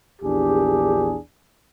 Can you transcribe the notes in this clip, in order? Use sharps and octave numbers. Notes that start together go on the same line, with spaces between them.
A#1 E2 D4 G4 G#4